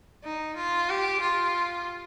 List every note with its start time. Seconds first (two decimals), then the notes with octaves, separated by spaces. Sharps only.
0.24 D#4
0.56 F4
0.89 G4
1.21 F4